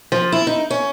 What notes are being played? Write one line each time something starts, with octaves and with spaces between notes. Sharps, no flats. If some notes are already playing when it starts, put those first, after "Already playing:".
F3
E4
D#4
C#4